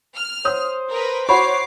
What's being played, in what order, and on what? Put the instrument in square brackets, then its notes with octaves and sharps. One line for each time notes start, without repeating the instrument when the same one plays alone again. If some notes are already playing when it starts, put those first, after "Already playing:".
[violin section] F6
[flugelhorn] C5 [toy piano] C#5 F#5 [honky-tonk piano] D#6
[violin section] A#4 B4
[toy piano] E4 B5 [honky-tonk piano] F#4 C#5 [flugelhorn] C5 [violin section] D6 C7